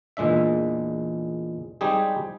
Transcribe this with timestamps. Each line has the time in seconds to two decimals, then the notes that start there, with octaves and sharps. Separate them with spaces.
0.17 E2 A#2 G#3 D4 E5
1.81 G3 G#3 C4 D#4 G4 G#4